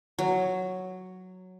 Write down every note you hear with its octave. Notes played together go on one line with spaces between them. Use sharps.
F#3